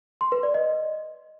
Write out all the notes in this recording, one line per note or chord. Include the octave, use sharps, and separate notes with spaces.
C6
B4
D5
D#5